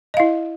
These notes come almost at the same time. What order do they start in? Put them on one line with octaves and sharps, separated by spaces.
D#5 F5 E4